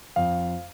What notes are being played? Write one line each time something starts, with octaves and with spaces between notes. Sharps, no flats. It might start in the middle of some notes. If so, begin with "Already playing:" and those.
F2 F5